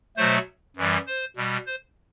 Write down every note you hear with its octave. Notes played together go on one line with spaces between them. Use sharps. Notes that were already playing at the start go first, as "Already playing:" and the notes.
B2 F#3 A3 C5
F#2 E3 G3
C5
B2 G3
C5